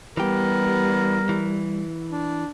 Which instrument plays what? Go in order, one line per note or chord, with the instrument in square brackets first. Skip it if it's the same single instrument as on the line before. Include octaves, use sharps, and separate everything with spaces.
[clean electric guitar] E3 G4 [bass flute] G3 [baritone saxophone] B3 [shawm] A#4
[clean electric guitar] E3
[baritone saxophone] D4